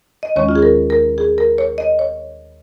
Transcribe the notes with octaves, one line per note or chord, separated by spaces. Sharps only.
D#5
D#2 D#3 G#3 C#4 C#5
F4
G#4
A#4
A#4
G#4
A#4
C#5
D#5
C#5